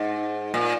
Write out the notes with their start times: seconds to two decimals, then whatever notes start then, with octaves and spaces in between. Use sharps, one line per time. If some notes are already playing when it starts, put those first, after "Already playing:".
Already playing: G#2
0.54 A#2